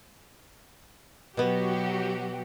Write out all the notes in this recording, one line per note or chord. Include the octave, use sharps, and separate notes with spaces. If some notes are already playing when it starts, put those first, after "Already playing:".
B2 F#3 B3 F#4 G4